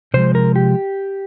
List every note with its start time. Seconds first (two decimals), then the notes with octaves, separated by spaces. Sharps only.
0.14 C3 F3 G#3 C5
0.35 A#4
0.56 G4